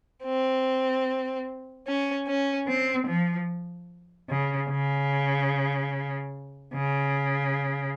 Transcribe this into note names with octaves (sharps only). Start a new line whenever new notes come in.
C4
C#4
C#4
C4
F3
C#3
C#3
C#3